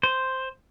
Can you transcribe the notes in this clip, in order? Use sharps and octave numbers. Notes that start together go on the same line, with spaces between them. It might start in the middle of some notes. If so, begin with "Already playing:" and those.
C5